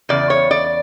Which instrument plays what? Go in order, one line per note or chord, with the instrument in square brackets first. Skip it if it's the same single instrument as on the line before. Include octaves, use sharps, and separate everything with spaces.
[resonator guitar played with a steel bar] E2 C#3 D5
C#5
D5